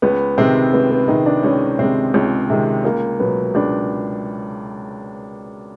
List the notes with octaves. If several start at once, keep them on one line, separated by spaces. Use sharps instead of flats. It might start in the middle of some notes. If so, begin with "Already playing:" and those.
C#2 B3
C3 D#3 G#3 C4
C#2 B3
B3
C3 D#3 G#3 D#4
D4
C#2 C#4
C3 D#3 G#3 C4
C#2
C3 D#3 G#3
C#2 A#3
B2 F#3 B3
C#2 D4